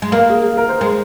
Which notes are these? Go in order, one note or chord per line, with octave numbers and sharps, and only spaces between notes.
G#3
A#3 A#4
G#4
A#4
C5
G#3 C5